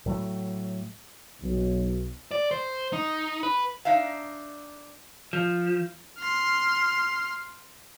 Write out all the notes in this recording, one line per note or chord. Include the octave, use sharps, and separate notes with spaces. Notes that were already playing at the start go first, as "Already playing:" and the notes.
A2 F#3 A3
B1
D5
C5
D#4
B4
D4 D#4 E5 F5
F3
C6 F6